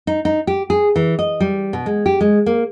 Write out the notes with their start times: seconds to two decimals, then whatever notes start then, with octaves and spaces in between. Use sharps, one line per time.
0.07 D#4
0.25 D#4
0.47 G4
0.70 G#4
0.96 E3
1.19 D#5
1.40 G3
1.73 B2
1.86 G#3
2.06 G4
2.21 G#3
2.46 A#3